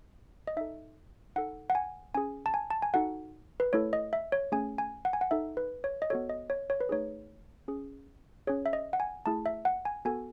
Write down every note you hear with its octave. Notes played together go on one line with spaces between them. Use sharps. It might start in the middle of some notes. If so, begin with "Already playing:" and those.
D#5
D#4 A4 E5
D#4 A4 F#5
F#5
G#5
C#4 G#4 G#5
A5
G#5
A5
G#5
D#4 F#4 A4 F#5
B4
A3 E4 A4 C#5
D#5
E5
C#5
A3 C#4 G#4 G#5
G#5
F#5
G#5
F#5
D#4 A4 E5
B4
C#5
D#5
B3 F#4 A4 C#5
D#5
C#5
C#5
B4
A3 D#4 G#4 C#5
C#4 G#4
C#4 G#4 C#5
E5
D#5
F#5
G#5
A3 E4 G#4 A5
E5
F#5
G#5
B3 F#4 A4 G#5